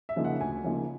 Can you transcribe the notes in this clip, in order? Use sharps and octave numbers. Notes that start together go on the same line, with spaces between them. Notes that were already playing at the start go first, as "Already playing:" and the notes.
E5
C#3 F3 A#3 D#4
F#5
D2 G#5
C#3 F3 A#3 D#4